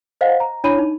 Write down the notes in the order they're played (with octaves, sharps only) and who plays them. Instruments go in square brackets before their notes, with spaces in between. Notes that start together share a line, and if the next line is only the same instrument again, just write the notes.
[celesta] C5 D#5 F5 F#5
A#5
D4 E4 C#5 B5 D#7
D#4